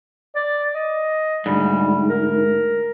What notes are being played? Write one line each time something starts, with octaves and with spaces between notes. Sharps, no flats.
D5
D#5
D2 G#2 G3
A#4